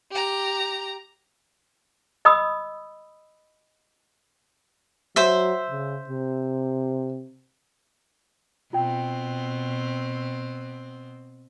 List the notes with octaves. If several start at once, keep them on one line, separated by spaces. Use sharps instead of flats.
G4 A#5
D#5 B5 D#6 E6
F#3 C5 E5
C#3
C3
B2 C4 F4 G5